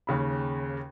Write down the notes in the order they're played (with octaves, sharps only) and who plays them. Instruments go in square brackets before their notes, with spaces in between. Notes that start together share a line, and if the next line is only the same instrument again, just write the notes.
[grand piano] D#2 C#3 B5